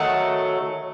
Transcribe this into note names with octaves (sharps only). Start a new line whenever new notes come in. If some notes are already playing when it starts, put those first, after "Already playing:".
Already playing: D#3 F#3 A3 F#5